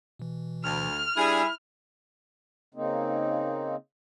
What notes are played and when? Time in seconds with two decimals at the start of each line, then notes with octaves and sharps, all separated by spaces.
0.19 B2 E3
0.64 D2 F6
1.17 G3 D4 E4 G#4 D5
2.75 C#3 A#3 C4 D#4